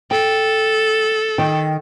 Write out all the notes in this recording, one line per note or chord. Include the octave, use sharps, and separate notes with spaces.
A4 G5
D#3 G5